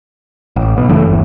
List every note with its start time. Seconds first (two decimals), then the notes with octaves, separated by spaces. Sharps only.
0.56 A1
0.77 B1 B2
0.89 F#2 C#3 E3 A3
1.08 G1 E2